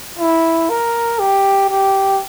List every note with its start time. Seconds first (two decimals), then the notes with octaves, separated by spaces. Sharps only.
0.20 E4
0.70 A#4
1.19 G4
1.70 G4